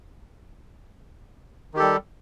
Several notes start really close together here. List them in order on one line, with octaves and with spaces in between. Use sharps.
D#3 G4 A4 G3